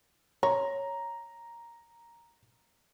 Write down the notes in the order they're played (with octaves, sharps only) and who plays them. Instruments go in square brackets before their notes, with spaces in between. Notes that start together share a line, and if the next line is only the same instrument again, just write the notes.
[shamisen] C#5 [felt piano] A#5